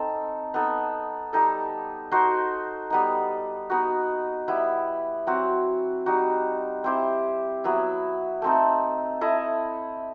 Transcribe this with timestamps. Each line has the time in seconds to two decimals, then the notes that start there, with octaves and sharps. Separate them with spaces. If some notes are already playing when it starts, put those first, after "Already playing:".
Already playing: C4 D#4 A4
0.54 B3 D#4 A4
1.33 G3 D#4 A4
2.11 D#4 F#4 C5
2.90 G3 B3 D#4
3.70 B3 D#4 F#4
4.48 G3 B3 E4
5.27 F#3 C4 F#4
6.06 G3 D#4 F#4
6.84 C4 E4 G4 C5
7.64 F#3 B3 E4
8.42 A3 C4 D#4 A4
9.21 E4 A4 D#5